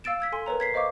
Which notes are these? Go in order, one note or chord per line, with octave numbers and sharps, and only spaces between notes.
F5 E6 A6 D7 E7
E6 G#6 B6
A4 G#5 C6
A#4 B4 C#5 A#5
G#6 B6 C7
C5 D#5 F5 C#6 D6